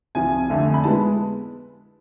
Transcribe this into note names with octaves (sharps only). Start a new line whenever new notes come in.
C2 C3 F3 G#5
F2 D3 A3 D4
B5
G#3 B3 A5